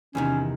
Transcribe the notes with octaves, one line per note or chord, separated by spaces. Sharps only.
E2 C3 D#3 C#4